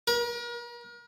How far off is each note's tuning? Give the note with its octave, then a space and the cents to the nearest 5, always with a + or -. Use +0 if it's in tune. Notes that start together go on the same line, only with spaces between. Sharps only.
A#4 +40